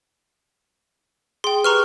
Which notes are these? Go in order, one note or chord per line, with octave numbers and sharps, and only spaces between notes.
G#4 G5 C6
G4 B4 A#5 C#6 F6